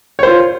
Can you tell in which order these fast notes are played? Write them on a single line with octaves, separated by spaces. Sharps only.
C#5 C5 F4